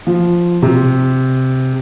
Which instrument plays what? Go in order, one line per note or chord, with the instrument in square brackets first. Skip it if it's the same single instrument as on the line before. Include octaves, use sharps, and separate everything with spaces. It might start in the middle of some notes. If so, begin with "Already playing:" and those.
[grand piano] F3
C3